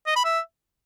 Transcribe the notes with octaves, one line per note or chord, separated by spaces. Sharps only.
D#5
B5
E5